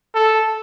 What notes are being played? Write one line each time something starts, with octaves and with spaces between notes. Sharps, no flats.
A4